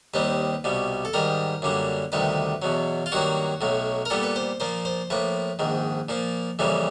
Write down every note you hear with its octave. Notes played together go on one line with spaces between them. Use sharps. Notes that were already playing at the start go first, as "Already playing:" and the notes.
D#2 D#3 G3 C4 B4
C2 B2 G3
A4
G#2 D#3 G3 A#4
F#2 D3 G3 A#3
D2 C3 D#3 G3 B4
E2 B2 F#3
F4
G2 D#3 F#3 A#3 F#4
B1 A2 F#3
A#4
A#2 G3 B3 A4
B4
C5
A#2 F3 A#3 C5
C5
A2 F3 A#3 B4
A#1 G#2 D#3
A#2 F3 A#3
F2 C#3 E3 G3 A#3